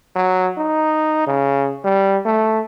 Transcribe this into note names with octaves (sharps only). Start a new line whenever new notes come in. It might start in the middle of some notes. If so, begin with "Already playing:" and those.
F#3
D#4
C#3
G3
A3